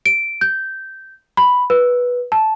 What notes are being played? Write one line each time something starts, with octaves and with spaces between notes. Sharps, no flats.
D7
G6
B5
B4
A5